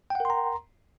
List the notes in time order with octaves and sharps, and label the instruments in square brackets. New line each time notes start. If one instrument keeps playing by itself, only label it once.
[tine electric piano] G5
F#5
A#4
C6
A#5